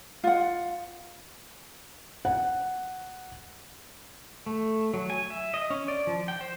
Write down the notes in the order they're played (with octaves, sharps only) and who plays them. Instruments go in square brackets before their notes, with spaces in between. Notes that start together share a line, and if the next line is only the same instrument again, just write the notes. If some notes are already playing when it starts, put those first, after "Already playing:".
[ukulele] F4 F#5
[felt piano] F#5
[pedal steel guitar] A3
F#3
G#5
E5
D#5
C#4
D5
F3
G5
C5